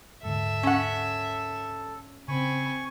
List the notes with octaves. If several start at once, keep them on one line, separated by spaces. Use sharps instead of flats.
D#1 G#2 D3 A4 E5
C#4 F#5
C#3 C4 G#5 B5 C#6